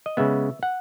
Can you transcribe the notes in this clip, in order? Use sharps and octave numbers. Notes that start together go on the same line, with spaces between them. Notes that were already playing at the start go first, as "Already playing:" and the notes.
D#5
C#3 G#3 B3 E5
F#5